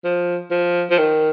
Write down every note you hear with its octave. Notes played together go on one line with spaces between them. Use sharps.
F3
F3
F3
D#3